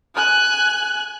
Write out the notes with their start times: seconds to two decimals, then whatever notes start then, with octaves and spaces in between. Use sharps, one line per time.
0.14 G#5 F#6